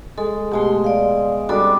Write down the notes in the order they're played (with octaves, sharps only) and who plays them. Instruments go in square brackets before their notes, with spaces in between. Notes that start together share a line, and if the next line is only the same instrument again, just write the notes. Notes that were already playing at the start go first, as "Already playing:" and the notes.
[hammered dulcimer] G#3 [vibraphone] A4
[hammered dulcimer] B2 G#3 C6 [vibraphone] A3 G4
[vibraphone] D5 F5
[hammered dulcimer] G3 C4 D4 [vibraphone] F#4 A4 D5